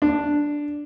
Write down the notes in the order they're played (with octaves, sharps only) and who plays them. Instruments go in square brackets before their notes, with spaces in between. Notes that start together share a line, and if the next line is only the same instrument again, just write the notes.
[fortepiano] D4